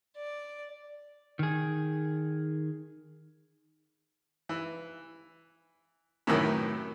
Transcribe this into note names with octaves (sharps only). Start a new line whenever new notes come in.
D5
D#3 G#4
E3
F#2 A2 C3 D#3 E3